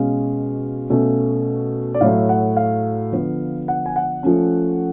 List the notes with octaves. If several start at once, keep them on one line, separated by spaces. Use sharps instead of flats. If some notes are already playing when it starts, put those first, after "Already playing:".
Already playing: B2 G#3 C#4 F5
B2 A3 C#4
D5
A2 F#3 A3 F5
F#5
F5
D3 F3 B3
F#5
G#5
F#5
F3 A3 C#4